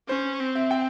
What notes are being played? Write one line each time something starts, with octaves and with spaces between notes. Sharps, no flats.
C#4 C5
C4
E5
G5